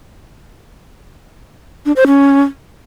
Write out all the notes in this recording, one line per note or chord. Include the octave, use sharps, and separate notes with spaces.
D4
C5
C#4